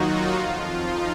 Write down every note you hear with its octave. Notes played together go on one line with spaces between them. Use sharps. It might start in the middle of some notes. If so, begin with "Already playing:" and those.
Already playing: D#2 D#3 F#3 D#4 F4 F#4
F2 F3
D#4